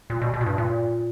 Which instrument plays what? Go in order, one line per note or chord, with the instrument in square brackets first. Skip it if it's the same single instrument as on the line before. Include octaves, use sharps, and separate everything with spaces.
[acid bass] A#2
B2
B2
A#2
G2
A#2